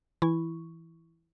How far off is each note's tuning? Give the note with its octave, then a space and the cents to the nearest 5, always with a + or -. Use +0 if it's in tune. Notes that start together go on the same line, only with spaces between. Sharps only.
E3 +0 E4 +0 C#6 +0